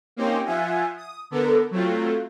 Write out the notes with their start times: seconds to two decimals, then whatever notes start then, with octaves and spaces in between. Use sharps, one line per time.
0.16 A#3 C4 C#4 D#4 G4 C5
0.45 F3 F4 E5 F#5 G#5
0.97 D#6
1.31 D3 B3 A4 A#4
1.71 F#3 A3 C4 F4